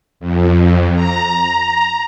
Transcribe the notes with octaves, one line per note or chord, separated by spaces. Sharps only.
F2
A#5